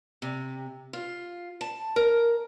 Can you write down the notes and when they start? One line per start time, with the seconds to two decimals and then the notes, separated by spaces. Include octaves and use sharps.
0.22 C3
0.93 F4
1.61 A5
1.96 A#4